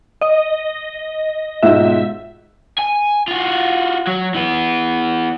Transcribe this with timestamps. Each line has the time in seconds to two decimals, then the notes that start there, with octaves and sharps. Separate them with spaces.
0.21 D#5
1.63 B1 G#2 F4 E5
2.78 G#5
3.28 F4 F#4
4.07 F#3
4.35 E3 B3